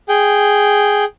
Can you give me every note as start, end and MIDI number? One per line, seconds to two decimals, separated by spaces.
0.09 1.05 68
0.09 1.05 79